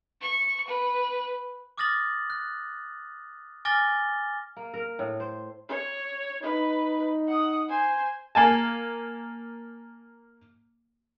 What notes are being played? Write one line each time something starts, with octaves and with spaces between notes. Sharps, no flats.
C#6
B4
D6 D#6 F6 A6 A#6 F#7
F#6
G#5 D6 F6 A6 A#6 G7
A#3
A#4
A2
C5
C#5
D#4 B4
F#5 D#6
C5 G#5
A#3 G#5 A5